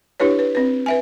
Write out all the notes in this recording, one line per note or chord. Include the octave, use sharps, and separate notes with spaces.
D4 E4 G4 B4 C#5
B4
C4 B4
B4 E5 G#5